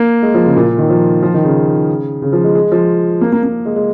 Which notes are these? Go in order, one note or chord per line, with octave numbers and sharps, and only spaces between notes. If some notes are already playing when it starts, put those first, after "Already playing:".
Already playing: A#3
G#3
F3
C#3
A#2
D#3
F3
F3
D#3
C#3
C#3
F3
G#3
G#3
F3
A#3
A#3
A#3
G#3
G#3